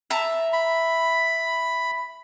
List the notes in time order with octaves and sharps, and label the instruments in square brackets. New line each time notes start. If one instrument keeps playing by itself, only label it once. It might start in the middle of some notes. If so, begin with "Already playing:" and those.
[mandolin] E5 A5 A#5
[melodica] B5